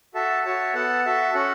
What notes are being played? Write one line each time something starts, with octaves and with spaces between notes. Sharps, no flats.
F#4 A4 E5 A5
F#4 C#5 E5 A5
B3 A4 F#5 A5
F#4 A4 E5 A5
C#4 F#4 A4 F#5